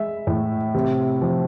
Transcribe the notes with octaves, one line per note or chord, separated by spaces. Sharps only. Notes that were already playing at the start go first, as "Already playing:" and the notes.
Already playing: G#3 E5
A2
C3
F3